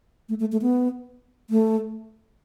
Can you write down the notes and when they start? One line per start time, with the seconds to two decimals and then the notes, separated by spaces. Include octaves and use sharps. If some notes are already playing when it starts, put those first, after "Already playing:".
0.29 A3
0.40 A3
0.52 A3
0.62 B3
1.50 A3